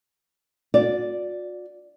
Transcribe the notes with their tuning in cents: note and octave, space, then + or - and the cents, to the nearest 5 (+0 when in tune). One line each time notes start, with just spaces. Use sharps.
F#4 -45 D5 +0